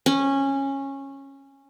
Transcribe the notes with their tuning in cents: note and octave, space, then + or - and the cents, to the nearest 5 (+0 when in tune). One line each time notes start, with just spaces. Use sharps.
C#4 -15